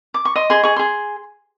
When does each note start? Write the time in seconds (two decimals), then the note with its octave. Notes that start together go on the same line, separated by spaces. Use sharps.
0.14 D6
0.25 C#6
0.36 D#5 C6
0.50 G#4 C6
0.63 G#4 C#6
0.76 G#4 C6